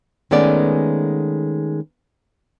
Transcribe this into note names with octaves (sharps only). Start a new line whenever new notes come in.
D#3 G#3 A3 B3 C#4 D5